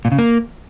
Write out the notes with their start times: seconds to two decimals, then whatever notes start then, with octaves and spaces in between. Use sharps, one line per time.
0.05 A#2
0.12 C#3
0.19 A#3